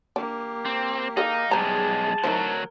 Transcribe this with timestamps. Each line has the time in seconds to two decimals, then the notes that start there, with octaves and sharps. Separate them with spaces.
0.16 A#3 D4 G4
0.65 C4
1.17 D#4 G#4 A4 D#5 F5
1.51 B1 G3 G#3 G#4 C5 A5 A#5
2.24 D2 F#3 D#4 E4 A#4 C5